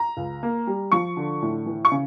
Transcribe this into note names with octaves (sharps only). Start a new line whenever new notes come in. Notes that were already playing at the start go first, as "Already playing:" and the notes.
Already playing: A#5
C#2
A#3
G3
F3 C#6
D3
A2
E3
C#6
C#3